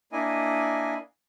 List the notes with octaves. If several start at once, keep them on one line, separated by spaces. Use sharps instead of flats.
A#3 D4 E4 D#5 G#5